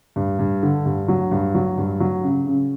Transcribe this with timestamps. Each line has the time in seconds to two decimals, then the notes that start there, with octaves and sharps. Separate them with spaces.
0.16 G2
0.39 G2
0.63 D3
0.86 G2
1.08 F#3
1.31 G2
1.55 F#3
1.77 G2
2.00 F#3
2.23 C#3
2.47 C#3